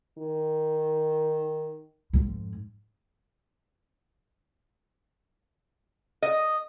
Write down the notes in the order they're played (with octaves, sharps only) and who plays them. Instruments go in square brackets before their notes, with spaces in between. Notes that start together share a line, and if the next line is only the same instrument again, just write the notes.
[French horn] D#3
[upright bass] F2 G#2
[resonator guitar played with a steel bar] D#5